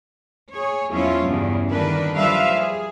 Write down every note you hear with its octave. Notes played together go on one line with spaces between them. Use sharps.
G#4 C#5
E2 F3 C#4 E4 F4 C#5
E2 G2 C#3
D3 D#3 G3 D4 A#4 B4
F3 G3 B4 E5 F5
G#4